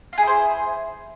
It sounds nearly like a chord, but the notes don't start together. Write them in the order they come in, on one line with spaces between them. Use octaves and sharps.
F4 G#4 E4 C5